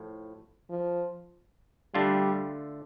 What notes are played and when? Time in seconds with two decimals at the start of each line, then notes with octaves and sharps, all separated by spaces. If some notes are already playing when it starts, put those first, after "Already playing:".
Already playing: A2 F3
0.70 F3
1.94 D3 G3 A3 D4 F4